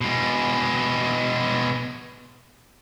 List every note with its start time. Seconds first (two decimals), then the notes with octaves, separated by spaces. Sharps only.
0.01 B2 G#3